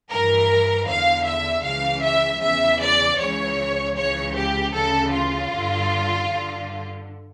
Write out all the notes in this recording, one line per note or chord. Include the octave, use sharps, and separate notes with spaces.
G2 E3 A#4
E2 D3 F5
E5
C#2 C#3 E3 F5
E5
E2 C#3 E3 E5
D5
C#2 C#3 E3 C#5
C#2 C#3 E3 C#5
G4
D2 C#3 E3 A4
F4
G2 D3
G2 D3